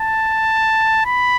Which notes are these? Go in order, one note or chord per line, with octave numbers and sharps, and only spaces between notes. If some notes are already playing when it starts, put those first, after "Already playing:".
Already playing: A5
B5